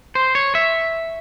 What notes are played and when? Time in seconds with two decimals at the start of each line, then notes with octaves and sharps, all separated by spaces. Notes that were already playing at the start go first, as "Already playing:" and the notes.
0.15 C5
0.35 C#5
0.55 E5